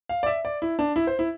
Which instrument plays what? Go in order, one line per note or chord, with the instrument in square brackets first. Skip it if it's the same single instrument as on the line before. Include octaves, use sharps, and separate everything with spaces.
[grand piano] F5
D5
E5
D5
E4
D4
E4
C5
E4